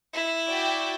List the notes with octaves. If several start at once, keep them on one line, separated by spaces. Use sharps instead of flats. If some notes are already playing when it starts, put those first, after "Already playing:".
E4
F#4 D5 G5